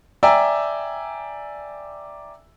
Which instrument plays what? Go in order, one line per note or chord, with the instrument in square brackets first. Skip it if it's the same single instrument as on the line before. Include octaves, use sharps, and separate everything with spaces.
[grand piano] D5 E5 G5 G#5 A#5 E6